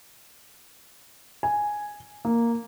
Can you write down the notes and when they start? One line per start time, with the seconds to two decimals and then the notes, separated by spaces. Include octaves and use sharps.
1.43 G#5
2.25 A#3